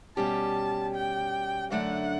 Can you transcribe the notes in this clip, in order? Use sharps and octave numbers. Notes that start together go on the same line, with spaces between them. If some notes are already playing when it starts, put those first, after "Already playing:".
B2 G3 C#4 G4 A5
G5
F#2 D3 A3 D4 F#5